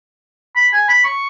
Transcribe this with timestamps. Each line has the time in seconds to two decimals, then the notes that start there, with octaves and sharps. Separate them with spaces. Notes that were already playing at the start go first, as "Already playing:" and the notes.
0.56 B5
0.73 G#5
0.89 B5
1.04 C#6